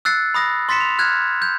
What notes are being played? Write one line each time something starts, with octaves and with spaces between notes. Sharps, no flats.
E6 F#6 A6 C7 C#7
B5 D#6 A#6
C6 A6 B6 C#7 E7
F7
F6 F#6 G#6
G6